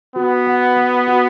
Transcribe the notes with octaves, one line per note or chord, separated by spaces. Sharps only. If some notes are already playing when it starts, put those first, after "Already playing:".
B3 F#4
F#5
F#5
F#4